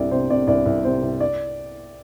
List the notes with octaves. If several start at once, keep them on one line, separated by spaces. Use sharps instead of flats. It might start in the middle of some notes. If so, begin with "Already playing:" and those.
Already playing: C2 C3 D5
C3 C5
C3 D5
C2 D5
C2
C3 C5
C2
D5